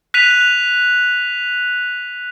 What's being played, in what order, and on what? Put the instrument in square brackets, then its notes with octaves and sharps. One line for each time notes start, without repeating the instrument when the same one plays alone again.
[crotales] F#6 B6 D#7 F7